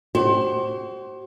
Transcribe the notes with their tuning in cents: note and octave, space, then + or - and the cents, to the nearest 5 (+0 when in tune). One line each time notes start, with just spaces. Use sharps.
F#4 +45 C5 +20